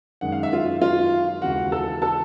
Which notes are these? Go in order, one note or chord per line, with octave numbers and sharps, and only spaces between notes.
F#2 D#3 G#3 F#5
F5
E5
F4 F5
F4 F5
D#2 C#3 E3 G#3 F#4 F#5
A4 A5
A4 A5